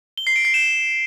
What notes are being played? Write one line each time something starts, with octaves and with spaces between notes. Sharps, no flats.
G7
C7
D7
C7
E7